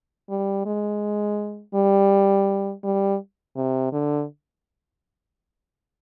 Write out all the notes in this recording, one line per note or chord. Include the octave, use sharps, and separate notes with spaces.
G3
G#3
G3
G3
C3
D3